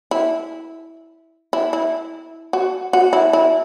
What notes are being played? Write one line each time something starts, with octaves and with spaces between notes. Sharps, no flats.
E4
E4
E4
F#4
F#4
E4
E4